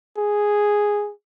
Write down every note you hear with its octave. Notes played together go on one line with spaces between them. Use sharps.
G#4